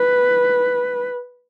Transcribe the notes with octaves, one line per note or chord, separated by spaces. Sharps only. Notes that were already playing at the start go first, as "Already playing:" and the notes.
Already playing: B4